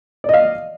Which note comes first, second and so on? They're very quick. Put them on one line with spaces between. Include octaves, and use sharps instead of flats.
D5 D#5 F5